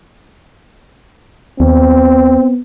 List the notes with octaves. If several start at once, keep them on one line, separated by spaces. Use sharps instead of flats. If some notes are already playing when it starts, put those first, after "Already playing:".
D#2 B3 C4